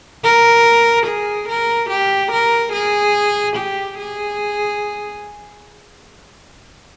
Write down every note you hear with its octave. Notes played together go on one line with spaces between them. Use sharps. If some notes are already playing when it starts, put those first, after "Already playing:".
A#4
G#4
A#4
G4
A#4
G#4
G4
G#4